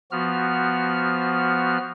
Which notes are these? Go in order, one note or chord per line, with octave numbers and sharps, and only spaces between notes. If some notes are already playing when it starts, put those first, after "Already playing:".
F3 B3 F#4 F6